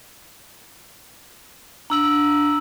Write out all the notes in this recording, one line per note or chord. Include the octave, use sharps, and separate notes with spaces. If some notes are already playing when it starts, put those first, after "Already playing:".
D4 A#5 E6 F#7